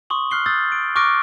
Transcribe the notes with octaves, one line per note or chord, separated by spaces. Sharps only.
C6 C#6 D#6 F#7
F6 F#6 C7 G7
D#6 E6 G6 A6
D7
C#6 D6 F6 F#6 A#6 D7